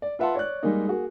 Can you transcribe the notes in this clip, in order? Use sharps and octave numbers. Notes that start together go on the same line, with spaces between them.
D5
F4 B4 E5 F#5 A5 C6
C#5 D5 F#6
G3 G#3 A#3 D#4
A#3 F#4 G#4